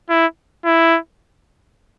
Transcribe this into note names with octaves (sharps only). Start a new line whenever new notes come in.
E4
E4